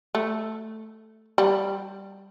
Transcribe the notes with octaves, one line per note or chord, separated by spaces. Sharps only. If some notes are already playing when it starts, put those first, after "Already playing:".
A3
G3